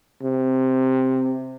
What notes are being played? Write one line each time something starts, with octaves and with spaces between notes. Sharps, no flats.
C3